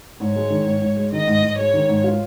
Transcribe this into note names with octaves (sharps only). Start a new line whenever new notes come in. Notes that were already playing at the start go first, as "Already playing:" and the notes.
G#2 C#5
G#3
D#3
G#2
G#2
G#3
D#3 D#5
G#2
G#2
G#3 C#5
D#3
G#2
F4